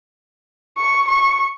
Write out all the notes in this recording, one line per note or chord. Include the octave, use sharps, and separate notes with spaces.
C#6
C#6